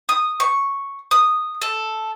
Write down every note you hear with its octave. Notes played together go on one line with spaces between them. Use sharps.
D#6
C#6
D#6
A4